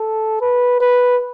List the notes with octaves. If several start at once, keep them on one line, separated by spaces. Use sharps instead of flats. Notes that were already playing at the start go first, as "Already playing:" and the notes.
Already playing: A4
B4
B4